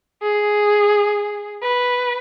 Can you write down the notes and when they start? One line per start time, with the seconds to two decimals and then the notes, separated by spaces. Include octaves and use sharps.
0.22 G#4
1.63 B4